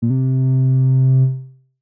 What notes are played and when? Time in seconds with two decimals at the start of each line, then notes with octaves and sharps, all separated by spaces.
0.02 A#2
0.10 C3